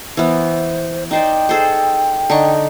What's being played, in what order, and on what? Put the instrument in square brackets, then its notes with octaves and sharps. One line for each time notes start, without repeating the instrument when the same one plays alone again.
[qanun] E3 B3 [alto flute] C5
[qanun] D#4 C5 D5 [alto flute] G5
[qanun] G#4 A4 C5
D3 D#4 C#6